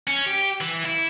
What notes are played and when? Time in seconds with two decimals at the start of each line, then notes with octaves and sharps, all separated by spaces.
0.07 C#4
0.26 G4
0.61 E3
0.86 E4